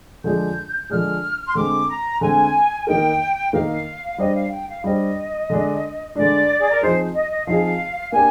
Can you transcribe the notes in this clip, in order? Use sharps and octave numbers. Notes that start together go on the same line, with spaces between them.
D3 F3 G#3 D4 G#4 G6
D3 F3 G#3 D4 G#4 F6
C6
D3 G#3 C4 D6
A#5
D3 G#3 C4 G#5
D#3 A#3 D#4 A#4 G5
D#3 A#3 D#4 A#4 F5
G3 D4 G4 C5 D#5
F5
G5
F5
G3 D4 G4 C5 D#5
D3 G#3 D4
D3 G#3 D4 D5
G#4
A#4
F3 C4 D#4 G#4 C5
D#5
D#5
F3 C4 D#4 G#4 F5
A#3 D4 G4 G#5